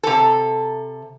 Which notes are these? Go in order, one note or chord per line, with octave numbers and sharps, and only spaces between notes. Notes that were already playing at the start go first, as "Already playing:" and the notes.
C3 A4